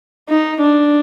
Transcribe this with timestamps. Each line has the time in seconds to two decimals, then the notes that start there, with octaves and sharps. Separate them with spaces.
0.29 D#4
0.61 D4